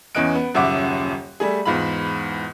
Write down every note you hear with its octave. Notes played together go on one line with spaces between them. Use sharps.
E2 E3 C#4 D#5 F#6 D7
B3
D#1 F#2 C#3 E5 F#5 D6
G3 A3 G#4
E2 G#2 F4 B5